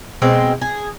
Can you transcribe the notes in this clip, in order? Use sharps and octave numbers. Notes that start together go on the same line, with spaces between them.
B2 G#3 C4
G#4